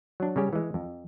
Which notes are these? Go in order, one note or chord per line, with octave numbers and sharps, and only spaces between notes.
F#3 D4
C#3 G3 C#4 G4
E3 G#3
F2